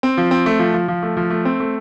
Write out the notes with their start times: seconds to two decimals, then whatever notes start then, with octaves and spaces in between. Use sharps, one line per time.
0.03 C4
0.17 F3
0.31 C4
0.46 A3
0.59 F3
0.74 F3
0.88 F3
1.03 A3
1.17 F3
1.30 A3
1.45 C4
1.60 A3